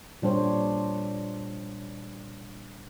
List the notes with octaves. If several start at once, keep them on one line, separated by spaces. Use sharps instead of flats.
A#2 G3 D4 C5 C#5